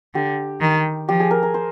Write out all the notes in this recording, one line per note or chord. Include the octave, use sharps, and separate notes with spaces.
D3 G4
D#3
F3 G4
G#4
A#4
A#4
C5